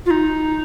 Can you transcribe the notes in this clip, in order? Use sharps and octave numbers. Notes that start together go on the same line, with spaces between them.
F4
D#4